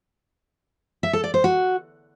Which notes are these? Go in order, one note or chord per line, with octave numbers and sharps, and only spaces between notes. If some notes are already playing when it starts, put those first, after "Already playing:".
E5
A4
D5
C5
F#4